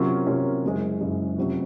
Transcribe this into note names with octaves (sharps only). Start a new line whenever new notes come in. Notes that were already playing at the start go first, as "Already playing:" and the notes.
Already playing: C3 F#3 A#3 C#4 F4
C3 F#3 A#3 C#4 F4
F#1 F#2 C#3 G#3
F#1 F#2 C#3 G#3
F1 F2 C3 F#3 C#4